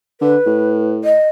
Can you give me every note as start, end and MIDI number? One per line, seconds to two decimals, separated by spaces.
0.21 0.37 50
0.21 0.92 71
0.46 1.17 45
1.04 1.29 75